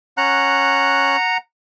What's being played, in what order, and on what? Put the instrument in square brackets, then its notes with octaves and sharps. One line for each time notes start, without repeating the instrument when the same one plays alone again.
[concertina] C#4 F#6 [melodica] F#5 A#5